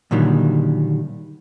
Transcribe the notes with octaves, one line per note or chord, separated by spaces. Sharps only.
A#2 D3 D#3 F#3 G3